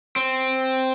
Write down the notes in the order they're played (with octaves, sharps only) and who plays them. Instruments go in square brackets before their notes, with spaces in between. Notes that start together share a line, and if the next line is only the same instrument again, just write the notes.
[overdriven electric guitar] C4